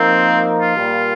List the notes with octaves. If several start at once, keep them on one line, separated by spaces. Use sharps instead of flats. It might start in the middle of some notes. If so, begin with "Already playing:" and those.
Already playing: F3 A#3 C4 D#4 A#4
F4
A#2 G3 A#3